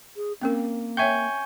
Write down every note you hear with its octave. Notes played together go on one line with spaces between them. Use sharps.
G#4
A#3 C4 C#4 A#4
C#5 E5 G5 G#5 C#6 G6